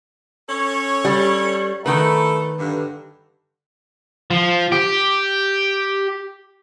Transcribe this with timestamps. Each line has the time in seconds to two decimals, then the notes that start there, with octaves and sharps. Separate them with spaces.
0.49 C#4 A4 C#5
1.05 G3
1.86 D#3 A3 A4 B4
2.58 G2 D3
4.31 F3
4.72 G4